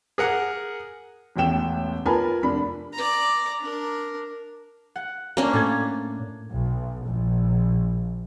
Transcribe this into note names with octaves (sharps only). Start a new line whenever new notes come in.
G#4 A#4 F#5
E1 A1 A3 G5 E7
F4 A#4 B4 G#5 A5 B5
F1 D4 B5
D5 A#5
D4 A#4
F#5
A#3 C#4 D4
A2 A5 G#6
B1
A#1